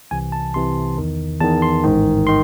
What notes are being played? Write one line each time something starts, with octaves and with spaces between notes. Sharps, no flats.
C2 C3 E3 G#5
A5
C2 C3 E3 C6
E2 D#3
E2 D#3 A5
C6
A1 G#2 D#3
D#3 C6